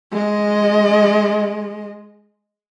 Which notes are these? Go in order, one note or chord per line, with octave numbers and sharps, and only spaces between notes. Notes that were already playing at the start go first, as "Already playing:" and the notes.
G#3 D#5